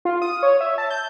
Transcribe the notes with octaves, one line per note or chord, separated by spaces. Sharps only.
F4
D#6
C#5
E5
A5
G6